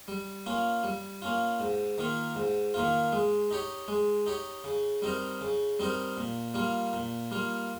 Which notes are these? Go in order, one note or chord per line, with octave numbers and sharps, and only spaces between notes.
G3
A#3 C#4 F4
G3
A#3 C#4 F4
G#2
D#3 A#3 F4
G#2
D#3 A#3 F4
G#3
D#4 G4 C#5
G#3
D#4 G4 C#5
C#3
G3 C4 D#4 A#4
C#3
G3 C4 D#4 A#4
A#2
G3 A#3 F4
A#2
G3 A#3 F4